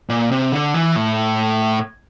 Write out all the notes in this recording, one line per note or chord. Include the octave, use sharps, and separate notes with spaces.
A#2
C3
D3
E3
A2